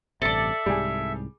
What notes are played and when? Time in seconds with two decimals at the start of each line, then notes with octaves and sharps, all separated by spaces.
0.22 A1 G2 C3 A4 D5 E5
0.66 C2 G#2 G3 G#4